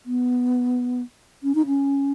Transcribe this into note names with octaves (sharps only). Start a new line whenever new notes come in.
B3
C#4
D#4
C#4